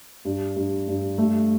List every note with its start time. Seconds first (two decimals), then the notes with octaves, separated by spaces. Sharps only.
0.25 G2
0.56 G2
0.88 G2
1.18 A3